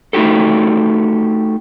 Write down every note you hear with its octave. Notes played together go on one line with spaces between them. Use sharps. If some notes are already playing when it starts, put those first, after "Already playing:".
A3 D#4 F#4 G4 A4